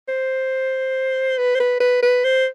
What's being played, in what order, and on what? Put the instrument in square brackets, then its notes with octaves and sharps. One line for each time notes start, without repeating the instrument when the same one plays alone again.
[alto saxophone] C5
B4
C5
B4
B4
B4
C5